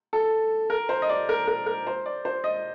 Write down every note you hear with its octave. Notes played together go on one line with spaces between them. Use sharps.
A4
A#4
C5
D#5
D5
A#4
A#4
A#4
C5
D5
C5
D#5